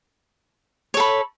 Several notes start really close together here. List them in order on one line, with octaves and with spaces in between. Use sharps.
C#5 A4 B5